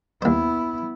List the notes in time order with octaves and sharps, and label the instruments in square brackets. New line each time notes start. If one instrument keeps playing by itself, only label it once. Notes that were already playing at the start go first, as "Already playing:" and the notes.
[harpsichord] D#2 C5 [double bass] B3 E4